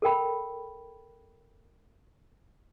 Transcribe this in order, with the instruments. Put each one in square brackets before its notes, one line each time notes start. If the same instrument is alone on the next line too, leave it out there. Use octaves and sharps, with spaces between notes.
[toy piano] A4 A#4 G5 B5